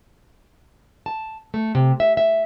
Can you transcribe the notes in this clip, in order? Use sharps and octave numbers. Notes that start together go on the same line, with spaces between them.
A5
A3
C3
E5
E5